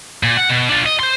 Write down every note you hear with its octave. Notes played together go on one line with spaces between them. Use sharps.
A#2
F#5
B2
D4 F4
D#5
C5 C6